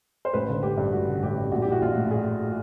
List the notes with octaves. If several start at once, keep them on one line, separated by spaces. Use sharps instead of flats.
C5
A1 B4
D3
A1 G4
G2
A1 F#4
D3
A1 G4
G2
A#1 F#4
G4
E3 F#4
A#1 F4
A2
G#4